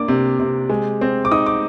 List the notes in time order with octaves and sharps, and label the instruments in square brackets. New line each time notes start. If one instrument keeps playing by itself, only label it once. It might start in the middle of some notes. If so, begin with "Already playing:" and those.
Already playing: [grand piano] A#3 D4 D6
C3
C3
G#3
C4
D6
D#4 D#6
D6